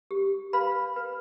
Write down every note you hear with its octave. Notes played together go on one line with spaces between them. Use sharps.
G4
B4 F5 B5
B4